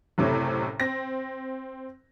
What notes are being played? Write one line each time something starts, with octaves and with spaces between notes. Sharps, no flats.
F#1 A2 C3 A3 C#5
C4 A#6